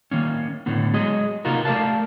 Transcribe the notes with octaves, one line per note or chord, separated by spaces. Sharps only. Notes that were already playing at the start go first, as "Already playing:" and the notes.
D#3 A#3 C#4
A2 D3 B3
F#3 G#3 G#4 D#5
C3 A#3 D#4 F4 F#4 A#4
A3 G4 A#4 D5 F5 A5